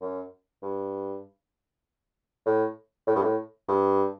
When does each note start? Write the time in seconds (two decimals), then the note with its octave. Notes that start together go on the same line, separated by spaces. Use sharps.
0.01 F#2
0.62 G2
2.46 A2
3.07 A2
3.15 G2
3.22 A2
3.68 G2